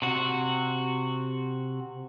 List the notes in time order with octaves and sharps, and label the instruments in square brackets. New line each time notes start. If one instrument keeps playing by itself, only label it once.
[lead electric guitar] C3 F#4